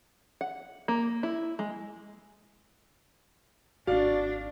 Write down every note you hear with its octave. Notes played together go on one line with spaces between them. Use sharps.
F#5
A#3
E4
G#3
G#1 D4 F#4 D5 F5